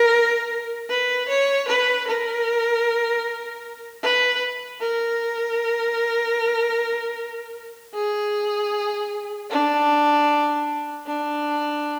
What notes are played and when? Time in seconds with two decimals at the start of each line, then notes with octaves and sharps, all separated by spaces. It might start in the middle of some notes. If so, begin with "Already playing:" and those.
Already playing: A#4
0.90 B4
1.28 C#5
1.68 B4
2.07 A#4
4.03 B4
4.81 A#4
7.94 G#4
9.50 D4
11.07 D4